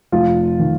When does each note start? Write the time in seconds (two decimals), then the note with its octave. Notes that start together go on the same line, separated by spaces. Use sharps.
0.12 F1 F4
0.59 D#3